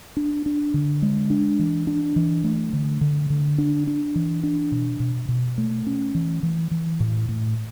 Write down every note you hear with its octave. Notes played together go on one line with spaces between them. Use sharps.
D4
D4
D3
G#3
D4
E3
D4
E3
A3
D3
D3
D3
D4
D4
E3
D4
B2
B2
B2
A3
C#4
E3
E3
E3
A2
A2